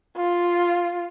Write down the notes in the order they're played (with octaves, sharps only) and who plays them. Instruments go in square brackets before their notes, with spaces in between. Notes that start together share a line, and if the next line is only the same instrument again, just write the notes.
[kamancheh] F4